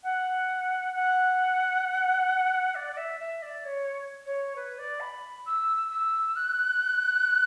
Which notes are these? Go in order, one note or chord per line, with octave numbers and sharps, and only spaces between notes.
F#5
F#5
D5
D5
E5
E5
D5
C#5
C#5
B4
D5
B5
E6
E6
F#6